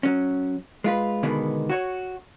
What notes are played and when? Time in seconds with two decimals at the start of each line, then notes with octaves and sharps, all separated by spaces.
0.03 F#3 C#4
0.84 G#3 F4 B4
1.23 B2 D3 D#3 G#3 B3
1.69 F#4 C#5